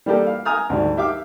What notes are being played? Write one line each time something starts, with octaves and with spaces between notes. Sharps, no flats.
G3 A#3 G4 A4
F5
G#5 A#5 D#6 F6
D2 G#2 G3
G4 E5 F5 D6